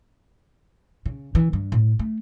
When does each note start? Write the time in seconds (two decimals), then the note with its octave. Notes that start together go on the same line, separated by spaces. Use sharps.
1.06 C#3
1.35 E3
1.53 G2
1.72 A2
1.99 A3